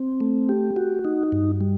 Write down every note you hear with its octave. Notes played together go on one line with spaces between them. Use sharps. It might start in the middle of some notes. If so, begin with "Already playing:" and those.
Already playing: C4
A3
G4
F#4
D#4
G2
G3